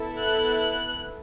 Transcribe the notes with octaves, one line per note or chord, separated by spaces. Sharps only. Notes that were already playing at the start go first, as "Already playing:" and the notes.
Already playing: B3 E4 A4
F#6
F#6